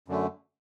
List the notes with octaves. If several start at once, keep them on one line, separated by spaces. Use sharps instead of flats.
F#2 D3 A3